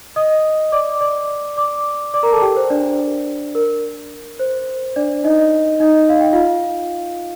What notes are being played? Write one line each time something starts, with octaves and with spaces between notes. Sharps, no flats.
D#5 D#6
D5 D6
D5 D6
D5 D6
D5 D6
A#4 A#5
A4 A5
G4 G5
A#4
C5
D4 D5
A#4
C5
D4 D5
D#4 D#5
D#4 D#5
F5
G5
F4 F5